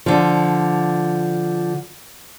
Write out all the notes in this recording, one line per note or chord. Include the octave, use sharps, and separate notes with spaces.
D3 F3